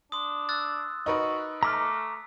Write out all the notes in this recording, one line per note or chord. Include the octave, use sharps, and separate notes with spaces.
D4 C6 D#6
E6 F#6 A6
D#4 F#4 A#4 B4
A3 A#5 D6 F6 B6